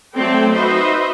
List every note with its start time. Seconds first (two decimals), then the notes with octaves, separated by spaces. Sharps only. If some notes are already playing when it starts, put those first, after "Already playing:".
0.15 F#3 A3 C4 A4 D5 G5
0.53 D#4 F#4 B4 C5 D#5 E5